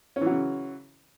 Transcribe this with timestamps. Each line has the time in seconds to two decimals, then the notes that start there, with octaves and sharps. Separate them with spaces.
0.16 C#4
0.21 E3
0.26 F#3
0.31 C#3